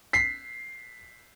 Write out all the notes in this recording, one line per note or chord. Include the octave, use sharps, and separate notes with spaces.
B6 C7